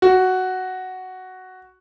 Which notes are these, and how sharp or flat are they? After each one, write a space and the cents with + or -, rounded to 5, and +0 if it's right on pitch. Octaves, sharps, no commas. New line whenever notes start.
F#4 +5